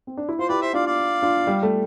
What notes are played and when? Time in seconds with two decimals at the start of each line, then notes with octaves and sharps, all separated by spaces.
0.07 C4
0.17 D4
0.29 E4
0.39 F4 C5
0.49 E4 G4 B4 D5
0.62 C5 E5
0.73 D4 F4 D5 F5
0.86 D5 F5
1.22 D4 F4
1.47 G3
1.63 A3